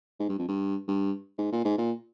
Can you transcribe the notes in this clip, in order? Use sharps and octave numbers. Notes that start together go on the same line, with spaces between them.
G#2
G2
F2
G2
G2
G#2
A#2
G#2
A#2